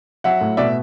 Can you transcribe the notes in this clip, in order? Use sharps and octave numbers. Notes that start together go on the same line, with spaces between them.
F#3 E5 F#5
A2
B2 D5 E5